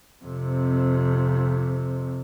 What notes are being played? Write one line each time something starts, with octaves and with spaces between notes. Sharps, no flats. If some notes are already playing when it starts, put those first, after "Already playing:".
F2 C3